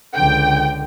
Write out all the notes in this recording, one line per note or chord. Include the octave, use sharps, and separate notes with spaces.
C#2 D3 G5